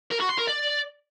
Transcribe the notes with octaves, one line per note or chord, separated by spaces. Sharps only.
A#4
F#4
C6
A#4
D5